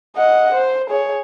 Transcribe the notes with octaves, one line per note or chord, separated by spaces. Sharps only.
D#5 F#5
C5
G#4 C#5